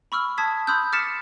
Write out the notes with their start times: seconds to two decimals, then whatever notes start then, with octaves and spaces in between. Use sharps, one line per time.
0.12 B5 C#6 E6 F6
0.38 A5 D#6 G#6 B6
0.67 B5 C6 D#6 E6 F#6 G6
0.92 D6 F6 A6 B6 C#7 E7